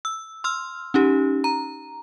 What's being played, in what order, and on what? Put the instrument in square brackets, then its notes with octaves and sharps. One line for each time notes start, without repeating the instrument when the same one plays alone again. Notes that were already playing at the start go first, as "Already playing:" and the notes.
[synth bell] E6
C6 E6 F6
C#4 D#4 G4
A#5